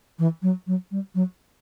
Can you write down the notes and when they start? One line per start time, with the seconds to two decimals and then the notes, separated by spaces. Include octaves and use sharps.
0.19 E3
0.42 F#3
0.67 F#3
0.91 G3
1.15 F#3